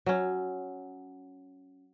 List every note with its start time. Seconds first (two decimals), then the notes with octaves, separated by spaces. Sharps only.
0.06 F#3 C#4